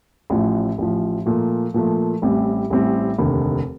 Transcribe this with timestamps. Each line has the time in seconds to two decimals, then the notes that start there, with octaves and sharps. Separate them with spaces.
0.30 A1 A2 F3
0.78 A1 A2 F3
1.26 A#2 F3 A3
1.74 A#2 F3 A3
2.22 A1 A2 G3 C4
2.70 A1 A2 G3 C4
3.18 F1 D#2 D3